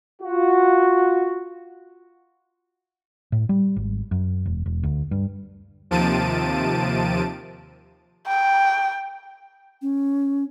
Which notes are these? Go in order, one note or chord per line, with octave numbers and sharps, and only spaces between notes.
F4 F#4
A2
G3
G#1
F#2
E1
E1
D2
G2
D#2 C3 F3 A5 D7 D#7
G5
C#4